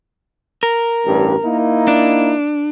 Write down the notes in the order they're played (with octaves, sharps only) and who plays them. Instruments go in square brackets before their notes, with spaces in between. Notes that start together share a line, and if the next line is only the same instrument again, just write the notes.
[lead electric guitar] A#4
[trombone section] A1 G2
A#3 D#4 E4
[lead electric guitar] D4